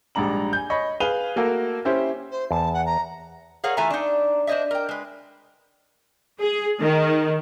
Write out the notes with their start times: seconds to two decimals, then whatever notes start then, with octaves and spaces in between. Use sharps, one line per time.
0.15 A#1 G#2 G3 D4 A#5 F#7
0.53 G#5 G6
0.70 C#5 D#5 B5 C#6
1.00 G#4 B4 F5 D#7 F7 G7
1.36 A3 A#3 F#4 A4 A#4
1.85 C#4 E4 G4 C5
2.31 C5
2.51 E2 A5
2.73 F#5
2.85 A#5
3.64 G#4 A#4 C#5 F5 F#5
3.77 E3 A3 F4 E5 G#5 A#5
3.90 D4 D#4
4.47 D4 C5 C#5 D#5 E5
4.71 A#4 G5
4.89 G#3 B4
6.41 G#4
6.82 D#3